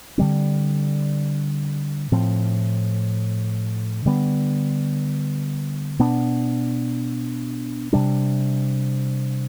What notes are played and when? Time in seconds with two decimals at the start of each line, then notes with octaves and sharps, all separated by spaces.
0.18 D3 G3 C4
2.12 A2 F3 C4
4.05 D3 G3 B3
5.99 B2 B3 D4
7.93 C3 G3 D4